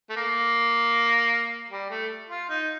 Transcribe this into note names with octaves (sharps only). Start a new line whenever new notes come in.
A3
A#3
G3
A3
F4
D#4